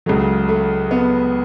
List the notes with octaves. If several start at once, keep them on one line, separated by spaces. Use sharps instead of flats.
C#2 C#3 F#3 A3
A3
B3